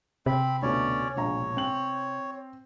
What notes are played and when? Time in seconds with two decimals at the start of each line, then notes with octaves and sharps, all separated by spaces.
0.26 C3 C4 B5
0.62 D2 B2 C#4 C#5 D5
1.16 E1 A#1 C#5 A#5
1.57 C4 C5 F#7